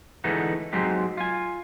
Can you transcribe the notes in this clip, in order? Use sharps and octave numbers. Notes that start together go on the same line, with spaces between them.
D3 E3 G#3 A3 B3 D#4
F#3 G#3 C4 D#4 G4
F4 G#5